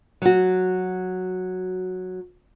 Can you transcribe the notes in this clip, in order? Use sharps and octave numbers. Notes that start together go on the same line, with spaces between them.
F#3 F#4